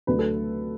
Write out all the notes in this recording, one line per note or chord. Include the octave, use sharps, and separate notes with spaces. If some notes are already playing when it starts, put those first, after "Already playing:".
D2 D3 F#3 B4
A4